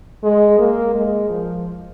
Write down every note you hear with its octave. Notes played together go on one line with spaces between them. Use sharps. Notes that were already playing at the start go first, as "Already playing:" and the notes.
G#3
A#3
G#3
F3